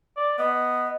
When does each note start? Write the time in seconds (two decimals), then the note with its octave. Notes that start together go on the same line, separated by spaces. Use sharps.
0.17 D5
0.39 B3 D#5